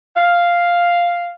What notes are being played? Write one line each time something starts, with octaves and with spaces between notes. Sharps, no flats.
F5